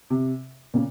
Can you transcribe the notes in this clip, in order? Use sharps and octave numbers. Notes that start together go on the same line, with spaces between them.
C3
A#2 C#3